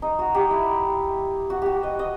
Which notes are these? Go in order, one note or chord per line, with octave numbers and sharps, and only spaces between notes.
D#4
F#4
G4
E4
F#4
F#4 G4
D#5
D#5